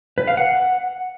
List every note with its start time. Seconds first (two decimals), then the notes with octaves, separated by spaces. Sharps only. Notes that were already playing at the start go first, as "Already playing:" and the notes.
0.18 B4
0.27 F5
0.37 F#5